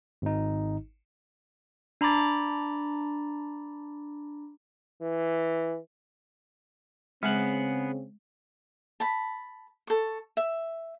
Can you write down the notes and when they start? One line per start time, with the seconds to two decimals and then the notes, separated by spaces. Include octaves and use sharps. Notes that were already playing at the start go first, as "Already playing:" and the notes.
0.22 G#1 D#4
2.01 D4 A#5 B5 D6 A6
5.01 E3
7.23 C#3 G#3 B3 C4 G#4 F#5
9.00 A5 B5
9.87 A4 C#6
10.37 E5